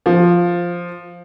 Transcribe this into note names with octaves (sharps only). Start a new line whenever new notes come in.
F3